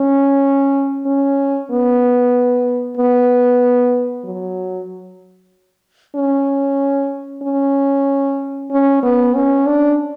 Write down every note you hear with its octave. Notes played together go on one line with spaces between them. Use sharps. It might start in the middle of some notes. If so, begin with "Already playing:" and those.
Already playing: C#4
C#4
B3
B3
F#3
C#4
C#4
C#4
B3
C#4
D4